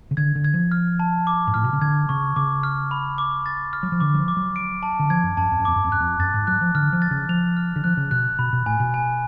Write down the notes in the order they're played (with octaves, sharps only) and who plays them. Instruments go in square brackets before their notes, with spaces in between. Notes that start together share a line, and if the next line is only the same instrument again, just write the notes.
[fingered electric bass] C#3
[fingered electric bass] D3 [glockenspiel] G#6
[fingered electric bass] D3
[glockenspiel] G#6
[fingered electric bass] F3
[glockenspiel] F6
A5
D6
[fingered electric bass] G#2
[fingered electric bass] A2 [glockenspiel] F6
[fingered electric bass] B2
C#3
[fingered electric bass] D3 [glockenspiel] G#6
[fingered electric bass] C#3 [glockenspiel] C#6
[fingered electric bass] C#3 [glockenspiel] D6
[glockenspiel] F6
B5
D6
A6
F6
[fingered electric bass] F#3
F3
[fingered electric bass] D3 [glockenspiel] D6
[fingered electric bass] F#3
F3
[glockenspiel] D6
[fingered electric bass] F#3
[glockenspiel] D7
A5
[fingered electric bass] D3
[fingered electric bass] F3 [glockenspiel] G#6
[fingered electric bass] F#2
[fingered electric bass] F#2 [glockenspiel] A5
[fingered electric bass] F2
F#2
[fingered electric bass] F2 [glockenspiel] D6
[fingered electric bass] F#2
F2
[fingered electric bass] F#2 [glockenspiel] F#6
[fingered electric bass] F2
[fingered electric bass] F#2 [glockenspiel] A6
[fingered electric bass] G#2
[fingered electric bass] F#3 [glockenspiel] F#6
[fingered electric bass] F3
[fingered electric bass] D3 [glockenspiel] F6
[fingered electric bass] F3
[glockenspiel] A6
[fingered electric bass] C#3
[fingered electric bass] F3 [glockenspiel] F7
[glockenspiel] F6
[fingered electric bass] D3
[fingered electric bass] F3 [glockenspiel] F#6
[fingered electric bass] C#3
[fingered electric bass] B2 [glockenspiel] F#6
[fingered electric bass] B2 [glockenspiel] B5
[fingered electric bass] B2
[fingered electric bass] A2 [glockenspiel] G#5
[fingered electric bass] B2
[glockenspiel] G#5